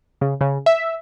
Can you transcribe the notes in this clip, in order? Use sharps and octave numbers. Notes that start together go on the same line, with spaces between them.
C#3
C#3
E5